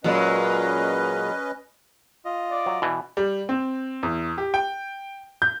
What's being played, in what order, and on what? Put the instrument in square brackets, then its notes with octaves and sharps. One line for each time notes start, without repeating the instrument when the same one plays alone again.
[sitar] A#2 F#3 G#3 [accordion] C#4 B4 D#5
[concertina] F4 D#5
[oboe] D5
[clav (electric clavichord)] F#3
B2 E3
[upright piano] G3
C4
E2
G4
G5
G6